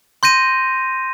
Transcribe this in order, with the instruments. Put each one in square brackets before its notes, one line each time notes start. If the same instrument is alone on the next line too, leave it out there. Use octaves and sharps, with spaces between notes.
[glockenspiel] C6 G6 A#6 D#7